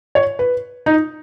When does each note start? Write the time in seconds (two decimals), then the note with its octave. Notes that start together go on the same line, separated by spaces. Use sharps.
0.15 C#5
0.39 B4
0.86 D#4